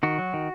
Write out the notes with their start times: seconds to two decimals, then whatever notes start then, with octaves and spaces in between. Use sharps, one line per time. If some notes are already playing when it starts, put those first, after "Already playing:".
0.03 D#3 F#4
0.19 F#3
0.34 D#3